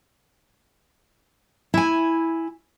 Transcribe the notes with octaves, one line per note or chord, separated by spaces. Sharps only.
E4 G#5